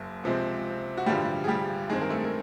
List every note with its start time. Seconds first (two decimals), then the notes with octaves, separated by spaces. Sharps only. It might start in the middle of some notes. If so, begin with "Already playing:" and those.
Already playing: F#1 F#2
0.24 C#2 C3 F3 G#3 C4
0.97 F#4
1.06 A1 G2 D3 F3 G3 G4
1.44 G#4
1.48 G3 G4
1.89 G2 D#3 G#3 C4 G#4
2.01 A#4
2.10 A3 A4
2.24 A#4